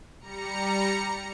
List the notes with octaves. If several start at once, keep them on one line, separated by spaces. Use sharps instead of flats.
G3 A#5 C#7